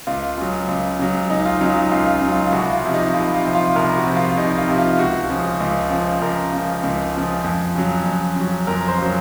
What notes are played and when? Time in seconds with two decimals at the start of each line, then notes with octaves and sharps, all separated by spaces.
0.07 C#2 F4
0.38 C#3 F#3
0.68 C#2
0.99 C#3 F#3
1.30 C#2 D#4
1.45 F4
1.61 C#3 F#3 D#4
1.77 F4
1.92 C#2 F4
2.12 F4
2.22 C#3
2.27 F#3
2.32 F4
2.52 C2 F#4
2.73 F4
2.84 C3 F3
2.94 D#4
3.14 C2 F4
3.34 F4
3.44 C3 F3
3.55 F4
3.76 C2 A#4
3.97 F#4
4.07 C3 F3
4.17 F4
4.38 C2 D#4
4.58 F4
4.68 C3 F3
4.78 F4
4.99 C#2 F#4
5.30 C#3 F3
5.60 C#2
5.90 C#3 F3
6.21 C#2 A#4
6.53 C#3 F3
6.83 C#2
7.14 C#3 F3
7.44 F2
7.75 C#3 F#3
8.06 F2
8.36 C#3 F#3
8.67 F2 A#4
8.88 C5
8.98 C#3 F#3